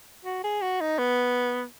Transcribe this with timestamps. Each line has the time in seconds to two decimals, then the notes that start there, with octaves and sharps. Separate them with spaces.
0.25 F#4
0.44 G#4
0.62 F#4
0.81 D#4
0.99 B3